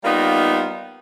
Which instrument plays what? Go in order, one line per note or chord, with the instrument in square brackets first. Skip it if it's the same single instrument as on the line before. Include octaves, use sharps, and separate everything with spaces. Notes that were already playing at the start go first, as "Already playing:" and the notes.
[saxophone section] G3 A#3 B3 D#4 F4